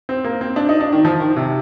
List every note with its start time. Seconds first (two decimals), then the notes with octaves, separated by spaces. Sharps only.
0.09 C4
0.24 A#3
0.41 C4
0.56 D4
0.69 D#4
0.80 D4
0.92 D#3
1.05 F3
1.20 D#3
1.36 C3